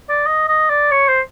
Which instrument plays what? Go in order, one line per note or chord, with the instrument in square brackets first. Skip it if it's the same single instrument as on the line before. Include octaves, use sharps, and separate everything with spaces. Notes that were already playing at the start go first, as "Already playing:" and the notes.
[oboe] D5
D#5
D#5
D5
C#5
C5